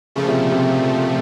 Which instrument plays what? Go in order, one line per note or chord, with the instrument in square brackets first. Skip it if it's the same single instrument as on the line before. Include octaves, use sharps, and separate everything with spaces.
[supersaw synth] A#2 F3 A3 [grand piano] C#3
[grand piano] C3
C3